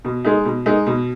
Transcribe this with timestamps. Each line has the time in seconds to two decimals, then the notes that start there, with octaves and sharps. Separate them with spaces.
0.05 B2
0.25 G#3 D#4
0.45 B2
0.66 G#3 D#4
0.86 B2